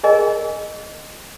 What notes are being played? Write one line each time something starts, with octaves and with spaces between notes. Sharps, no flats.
G#4 A#4 D#5 G#5